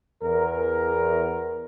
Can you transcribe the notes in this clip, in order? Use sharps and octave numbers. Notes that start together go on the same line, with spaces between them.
E2 A#4